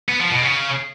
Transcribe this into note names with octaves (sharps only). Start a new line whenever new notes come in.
B3
F3
B2
C#3